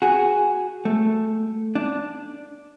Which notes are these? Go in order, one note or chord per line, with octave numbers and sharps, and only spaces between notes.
F#4 G#4
A3
D4